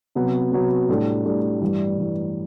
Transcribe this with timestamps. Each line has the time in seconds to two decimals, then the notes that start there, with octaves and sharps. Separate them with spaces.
0.15 C3 F#3 B3
0.52 C3 F#3 B3
0.89 A2 G3 D4 A4
1.25 A2 G3 D4 A4
1.61 G2 E3 G3
1.98 G2 E3 G3